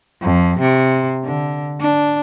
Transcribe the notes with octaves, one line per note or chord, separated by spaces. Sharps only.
F2
C3
D3
D4